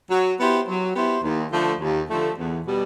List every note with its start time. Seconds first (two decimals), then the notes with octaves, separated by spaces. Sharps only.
0.11 F#3
0.39 B3 E4 G4 C5
0.68 F#3
0.95 B3 E4 G4 C5
1.23 D#2
1.52 D3 F3 A3
1.80 D#2
2.09 D3 F3 A3
2.37 E2
2.65 B2 G3